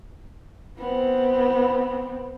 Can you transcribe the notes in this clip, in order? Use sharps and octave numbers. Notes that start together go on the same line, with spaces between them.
B3 C4